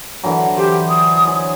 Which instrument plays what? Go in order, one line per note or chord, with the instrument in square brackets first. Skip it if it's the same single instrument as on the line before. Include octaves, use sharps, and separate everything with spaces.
[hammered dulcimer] D3 E3 F#3
[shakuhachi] G4 [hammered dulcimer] C5
[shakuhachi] D#6
[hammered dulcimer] C#5 G#5